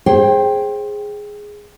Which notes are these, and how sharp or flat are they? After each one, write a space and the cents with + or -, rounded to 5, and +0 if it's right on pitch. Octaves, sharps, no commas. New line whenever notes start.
G#4 +0 C5 +25 G5 +0